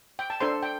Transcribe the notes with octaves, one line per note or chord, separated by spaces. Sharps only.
G5
A5
D4 A4 C5 C6
G5